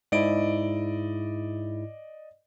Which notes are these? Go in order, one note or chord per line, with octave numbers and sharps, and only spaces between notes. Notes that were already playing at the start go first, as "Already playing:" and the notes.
G#2 E4 D5 D#5 D7